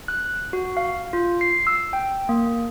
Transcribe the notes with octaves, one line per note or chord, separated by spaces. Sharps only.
F#6
F#4
F5
F4
C7
E6
G5
A#3